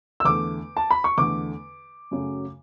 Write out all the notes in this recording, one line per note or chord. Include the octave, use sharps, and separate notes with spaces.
E6
E2 D3 A3 D6
A5
B5
C#6
E2 D3 A3 D6
F#2 C#3 F#3 A3